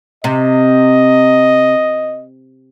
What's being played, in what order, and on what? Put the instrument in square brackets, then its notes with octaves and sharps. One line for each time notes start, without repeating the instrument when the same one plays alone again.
[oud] C3 [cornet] D#5